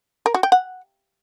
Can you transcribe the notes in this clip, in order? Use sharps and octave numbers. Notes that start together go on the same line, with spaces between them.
A#4
F#4
G5
F#5